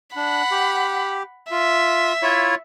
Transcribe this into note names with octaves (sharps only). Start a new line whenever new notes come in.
D4 F#5 B5
G4
F4 E5
E4 F4 C#5